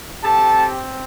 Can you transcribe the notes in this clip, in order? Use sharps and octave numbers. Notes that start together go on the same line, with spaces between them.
C4 G4 A4 A5